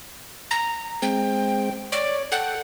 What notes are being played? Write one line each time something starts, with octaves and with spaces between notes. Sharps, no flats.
A#5
G#3 C4 G5
C#5 D5
A4 F#5 G5